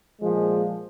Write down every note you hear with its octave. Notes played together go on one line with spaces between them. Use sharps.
A#2 F3 G#3